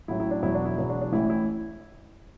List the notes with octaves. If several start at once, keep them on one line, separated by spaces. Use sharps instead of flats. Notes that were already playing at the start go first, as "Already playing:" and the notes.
A1 A2 F#3 E4
E4
D4
E1 E2 B2 F#3 E4
D4 F#4
E4
E1 E2 B2 F#3 E4
D4 F#4
D4
A1 A2 E3 E4
E4